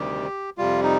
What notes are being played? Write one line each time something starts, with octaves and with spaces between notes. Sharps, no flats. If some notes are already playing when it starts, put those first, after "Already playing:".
Already playing: D2 C3 D#3 G3 G4
F2 C3 G3 F4
D#4